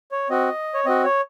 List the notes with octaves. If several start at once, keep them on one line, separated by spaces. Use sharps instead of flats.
C#5
C4 F#4 D#5
C#5
C4 F#4 D#5
C#5